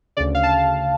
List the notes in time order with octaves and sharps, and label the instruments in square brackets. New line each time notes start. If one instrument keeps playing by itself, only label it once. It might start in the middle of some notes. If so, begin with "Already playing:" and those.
[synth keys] D2 C#3 D5
F5
A5